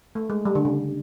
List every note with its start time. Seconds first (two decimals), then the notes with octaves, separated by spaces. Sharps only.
0.15 A3
0.30 G#3
0.45 G3
0.55 D3
0.65 C#3